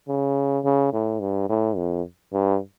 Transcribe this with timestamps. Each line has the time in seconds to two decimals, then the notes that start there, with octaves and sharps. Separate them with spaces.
0.09 C#3
0.65 C#3
0.93 A2
1.21 G2
1.49 A2
1.77 F2
2.33 G2